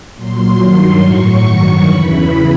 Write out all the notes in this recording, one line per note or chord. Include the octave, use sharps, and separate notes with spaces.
A#2 F#3 C6
G2 D#3 F#3 C6
A2 F#3 C#6
G2 D#3 F#3
E2 C#3 E3 B5